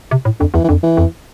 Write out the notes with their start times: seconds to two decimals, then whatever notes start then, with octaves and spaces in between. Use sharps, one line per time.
0.11 C3
0.25 A2
0.40 F2 D3
0.54 E2 E3
0.64 E3
0.68 F2 D3
0.83 E3
0.97 F2